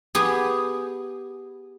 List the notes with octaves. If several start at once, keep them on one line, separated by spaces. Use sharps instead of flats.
B3 G4 G#4